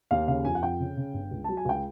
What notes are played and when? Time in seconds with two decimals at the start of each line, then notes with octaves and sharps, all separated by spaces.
0.11 D#2 F5
0.28 C#3 F5
0.45 F2 G#5
0.55 F#5
0.63 F2 G5
0.80 C#3
0.97 C#3
1.14 G1
1.31 C#2
1.44 F#3 A5
1.57 G#5
1.65 C#2 G5